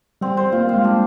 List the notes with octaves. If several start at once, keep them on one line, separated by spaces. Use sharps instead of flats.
G3 C4
C5
A#3 F4
A#3
G#3 F5
D4